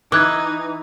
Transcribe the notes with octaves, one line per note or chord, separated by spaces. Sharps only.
E3 D#4 D6 F#6 G#6